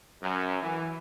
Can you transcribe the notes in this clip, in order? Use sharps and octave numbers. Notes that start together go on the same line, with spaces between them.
F#2
E3